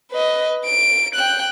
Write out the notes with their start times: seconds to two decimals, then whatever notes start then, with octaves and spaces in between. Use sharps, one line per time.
0.11 B4 D#5
0.65 D7
1.15 G5 F#6